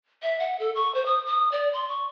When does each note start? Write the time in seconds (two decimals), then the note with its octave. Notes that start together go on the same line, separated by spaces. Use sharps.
0.23 E5
0.39 F#5
0.60 A4
0.75 C#6
0.95 C5
1.06 D#6
1.26 D#6
1.52 D5
1.73 C6
1.88 C#6